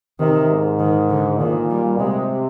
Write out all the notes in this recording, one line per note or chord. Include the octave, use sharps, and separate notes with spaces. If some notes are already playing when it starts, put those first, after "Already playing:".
C3 D#3
G#2
D#3
D3
A#2 D#3
G3
C3 G#3